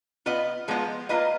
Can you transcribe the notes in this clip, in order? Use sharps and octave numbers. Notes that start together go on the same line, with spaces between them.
B3 F4 B4 D#5
F3 G#3 B3 F4
A#3 F4 B4 D#5